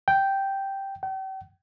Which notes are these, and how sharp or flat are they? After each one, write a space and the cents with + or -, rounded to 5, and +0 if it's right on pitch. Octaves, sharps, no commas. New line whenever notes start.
G5 -5
G5 -40